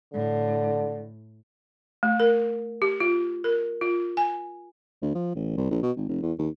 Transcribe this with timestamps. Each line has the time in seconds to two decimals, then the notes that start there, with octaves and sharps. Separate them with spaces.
0.14 A2 D3
2.03 A3
2.20 A#4
2.82 G4
3.00 F4
3.44 A#4
3.81 F4
4.17 G#5
5.02 D2
5.15 F3
5.35 A1
5.57 C2
5.71 A#1
5.82 B2
5.97 G#1
6.09 F1
6.22 E2
6.38 D#2